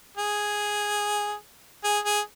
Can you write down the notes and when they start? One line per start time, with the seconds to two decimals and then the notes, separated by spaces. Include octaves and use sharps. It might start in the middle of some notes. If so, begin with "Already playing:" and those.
0.17 G#4
1.84 G#4
2.05 G#4